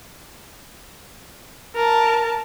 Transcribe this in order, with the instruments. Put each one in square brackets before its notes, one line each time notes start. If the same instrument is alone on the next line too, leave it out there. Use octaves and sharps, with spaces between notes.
[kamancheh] A#4 A5